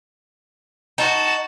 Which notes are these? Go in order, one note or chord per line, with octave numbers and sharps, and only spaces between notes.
D#4 F#4 A5